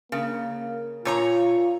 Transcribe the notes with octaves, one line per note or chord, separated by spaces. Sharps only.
C#3 A#3
A#2 F4 C#5 A#5